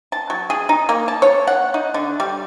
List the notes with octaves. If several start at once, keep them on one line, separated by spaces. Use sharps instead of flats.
A5
F#3
G#4
D#4
A#3
A5
C#5
F#5
D#4
D3
G3